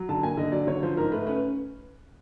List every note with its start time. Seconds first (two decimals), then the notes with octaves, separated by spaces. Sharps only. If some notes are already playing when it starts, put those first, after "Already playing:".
Already playing: F#3
0.09 D3 A5
0.23 A#3 G#5
0.37 D3 D#5
0.52 F#3 D5
0.67 D3 C#5
0.83 F3 C5
0.97 G#2 A#4
1.12 A3 B4
1.27 C#4 B4